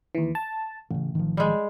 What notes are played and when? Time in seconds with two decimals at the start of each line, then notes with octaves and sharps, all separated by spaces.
0.15 D#2 E3
0.35 A5
0.91 A1 A2 C#3
1.15 D#3 F3
1.37 G3 G#3